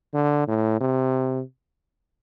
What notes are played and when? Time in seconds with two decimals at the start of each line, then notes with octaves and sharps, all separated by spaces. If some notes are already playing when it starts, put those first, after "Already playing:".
0.14 D3
0.48 A2
0.81 C3